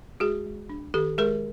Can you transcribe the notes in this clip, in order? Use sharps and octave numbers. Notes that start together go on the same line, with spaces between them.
G#3 F#4 G#4
G#3
D4
D#3 G4 A4
G#3 G#4 A#4